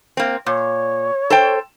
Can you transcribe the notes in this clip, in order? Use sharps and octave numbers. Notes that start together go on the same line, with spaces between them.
A#3 C4
A#2 C#5
A4 C5 G5